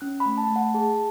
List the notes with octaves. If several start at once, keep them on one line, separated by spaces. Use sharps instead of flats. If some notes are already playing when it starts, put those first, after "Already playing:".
C#4 F#6
B5
A3
A5
A3
F#5
G#4 A5